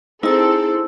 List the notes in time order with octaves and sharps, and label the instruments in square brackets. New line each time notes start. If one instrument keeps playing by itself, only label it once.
[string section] C4 A4 [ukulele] D#4 [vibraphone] E4 E6 [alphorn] G#4